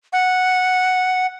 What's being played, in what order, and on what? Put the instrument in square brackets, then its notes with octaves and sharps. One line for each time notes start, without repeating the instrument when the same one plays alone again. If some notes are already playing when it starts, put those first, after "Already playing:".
[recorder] F#5